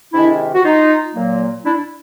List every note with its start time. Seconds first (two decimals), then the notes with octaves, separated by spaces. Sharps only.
0.12 C3 D#3 G#3 D4 E4
0.54 F#4
0.63 D#4 F4
1.14 A#2 F#3 A#3
1.64 D4 E4